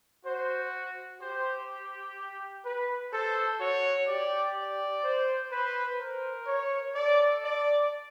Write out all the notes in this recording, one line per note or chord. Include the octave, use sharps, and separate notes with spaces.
F#4 C5
G4 C5
B4
A4 C5
F#4 C#5
G4 D5
D5
C5
B4 C5
A#4 C5
C#5
A4 D5
D5